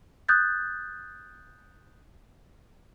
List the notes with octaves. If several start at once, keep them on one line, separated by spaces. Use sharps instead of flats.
D#6 F#6 G6 A6